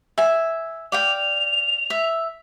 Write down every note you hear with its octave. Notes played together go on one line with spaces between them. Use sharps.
E5 G#5
D5 F5 G5 F7
E5